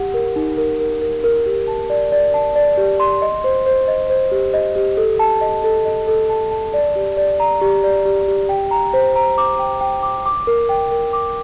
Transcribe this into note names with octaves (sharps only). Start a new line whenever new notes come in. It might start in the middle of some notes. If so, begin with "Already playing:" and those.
Already playing: G4 F#5
A#4
D#4
A#4
A#4
A#4
A#4
G4
A5
D5
D5
A5
D5
G4
C6
D#5
C5
C5
D#5
C5
G4
D#5
G4
A4
A5
D#5
A4
D#5
A4
A5
A5
D5
G4
D5
A#5
G4
D5
G4
G4
G5
A#5
C5
A#5
D6
G5
G5
D6
D6
A#4
G5
A#4
D6